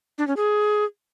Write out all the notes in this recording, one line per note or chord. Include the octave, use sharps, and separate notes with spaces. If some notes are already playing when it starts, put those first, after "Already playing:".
D4
C#4
G#4